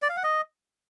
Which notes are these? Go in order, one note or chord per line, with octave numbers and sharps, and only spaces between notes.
D5
F5
F#5
D#5